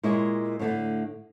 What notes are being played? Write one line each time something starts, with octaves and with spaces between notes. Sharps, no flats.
A#2 G#3 E4 C#5 D#5
A2 D3 A3